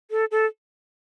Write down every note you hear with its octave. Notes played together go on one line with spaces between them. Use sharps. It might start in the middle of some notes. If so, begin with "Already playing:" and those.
A4
A4